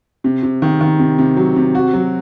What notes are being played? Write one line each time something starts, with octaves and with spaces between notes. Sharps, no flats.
C3
C3
D#3
D#3
C3
C3
F#3
C3
F#4
F#3